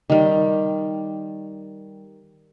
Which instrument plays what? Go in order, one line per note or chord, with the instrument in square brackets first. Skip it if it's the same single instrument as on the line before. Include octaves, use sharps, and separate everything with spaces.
[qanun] D#3 G3